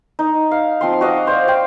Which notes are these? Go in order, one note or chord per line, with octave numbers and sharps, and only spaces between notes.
D#4
F5
F3 C4 C6
F#4 D#5 F5 D6
C5 D5 F5
F5 G5